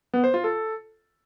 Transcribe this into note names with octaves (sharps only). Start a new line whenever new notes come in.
B3
C5
F4
A4